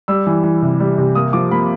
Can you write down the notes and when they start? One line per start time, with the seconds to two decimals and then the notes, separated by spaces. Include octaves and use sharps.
0.08 G3 E6
0.27 E3
0.44 E3
0.62 C3
0.80 G3
0.98 C3
1.15 A#3 D#6
1.33 F3 D6
1.51 A#3 B5